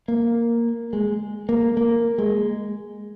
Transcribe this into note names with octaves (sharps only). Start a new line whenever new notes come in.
A#3
G#3
A#3
A#3
G#3